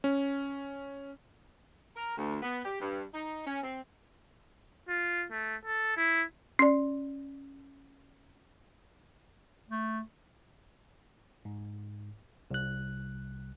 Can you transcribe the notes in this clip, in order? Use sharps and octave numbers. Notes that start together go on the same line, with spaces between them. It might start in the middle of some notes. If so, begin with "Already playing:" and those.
C#4
A#4
D2
B3
G4
G2
D#4
C#4
C4
F4
A3
A4
E4
C#4 D5
A3
G#2
C2 F#6